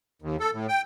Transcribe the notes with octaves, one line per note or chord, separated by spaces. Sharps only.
D#2
A4
A2
G5